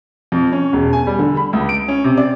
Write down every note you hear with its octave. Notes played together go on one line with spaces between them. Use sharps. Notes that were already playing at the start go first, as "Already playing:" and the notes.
F2
C#4
E1
G#5
G3
D3
B5
C#2
D7
C#4
C3
D5